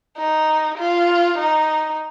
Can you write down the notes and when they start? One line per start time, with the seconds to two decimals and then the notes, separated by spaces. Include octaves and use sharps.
0.17 D#4
0.78 F4
1.38 D#4